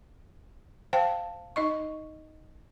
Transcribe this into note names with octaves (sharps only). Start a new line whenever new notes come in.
C5 F5 G5 A5
D#4 D#5 C#6